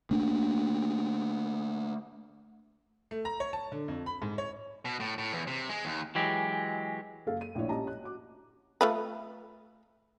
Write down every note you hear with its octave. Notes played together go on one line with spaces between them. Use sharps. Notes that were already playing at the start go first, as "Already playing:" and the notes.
A3 A#3 D4
A3
A#5
C#5
A5
D3
F2
B5
G#2
C#5
B2
A2
A2
E2
C3
G#3
D#2
E3 F#3 G#3 G4
F#1 A4 F5
D#7
A#1 A2 D4 E4 C#5
C#4 G4 D#5 A5 A#5
F#6
F#4 D6
A3 F4 B4